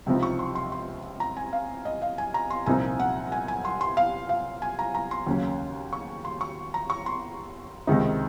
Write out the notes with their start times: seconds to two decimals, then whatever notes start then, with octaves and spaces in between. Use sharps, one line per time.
0.06 C#2 C3 F3 C4 D#4
0.23 C#6
0.39 C6
0.55 C6
0.72 C6
1.20 A#5
1.37 G#5
1.53 F5
1.85 D#5
2.02 F5
2.18 G#5
2.34 A#5
2.50 C6
2.66 C2 A#2 F3 C4 D#4 G#5
3.00 F#5
3.32 G#5
3.48 G#5
3.65 C6
3.81 C6
3.97 F5
4.29 F5
4.62 G#5
4.79 A#5
4.95 A#5
5.11 C6
5.27 D#2 C#3 F#3 A#3 C#4
5.93 C#6
6.25 C6
6.41 C#6
6.74 A#5
6.90 C#6
7.06 C6
7.87 C#2 C3 D#3 G#3 D#4